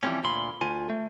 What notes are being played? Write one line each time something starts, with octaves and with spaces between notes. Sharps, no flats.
E3 F3 G3 G#3 C4 C#4
D2 A#2 B5 C6
D2 F4 G#5
A3